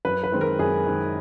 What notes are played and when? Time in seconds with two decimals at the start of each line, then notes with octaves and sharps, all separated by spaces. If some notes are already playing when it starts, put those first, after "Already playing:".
0.05 F#2 B4
0.23 B4
0.32 D#3 G#3 C4
0.41 A#4
0.59 F#2 G#4
0.87 D#3 G#3 C4